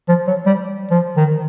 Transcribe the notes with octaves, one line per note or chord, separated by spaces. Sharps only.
F3
F#3
G3
F3
D#3